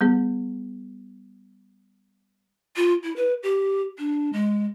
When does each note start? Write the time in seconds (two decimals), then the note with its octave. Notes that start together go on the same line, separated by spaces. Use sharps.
0.01 G3 B3 G#4
2.76 F4
3.04 E4
3.16 B4
3.43 G4
3.98 D4
4.33 G#3